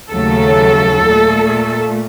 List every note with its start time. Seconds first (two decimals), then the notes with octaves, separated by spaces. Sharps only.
0.11 D#2 C#3 F#3 A3 A4
1.05 A#2 A3